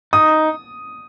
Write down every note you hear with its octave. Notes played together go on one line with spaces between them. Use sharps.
D#4 D#6